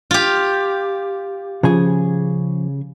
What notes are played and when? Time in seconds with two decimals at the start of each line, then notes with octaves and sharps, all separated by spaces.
0.11 F4 G4
1.63 C#3 F3 G#4